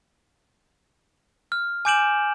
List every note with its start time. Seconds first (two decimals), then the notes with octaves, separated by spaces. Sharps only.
1.52 F6
1.85 G#5 D6 G6 D7 E7 F#7